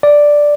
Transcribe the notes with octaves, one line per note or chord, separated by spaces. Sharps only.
D5